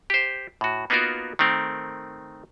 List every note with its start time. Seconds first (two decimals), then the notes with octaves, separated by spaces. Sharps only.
0.10 G4 C5
0.61 A2 F#4
0.90 A#3 B3 D#4 F4 F#4 A#4
1.39 D#3 A3 C4 A#4